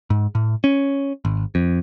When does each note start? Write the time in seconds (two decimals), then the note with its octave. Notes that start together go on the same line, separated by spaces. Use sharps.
0.10 G#2
0.35 A2
0.64 C#4
1.25 G#1
1.55 F2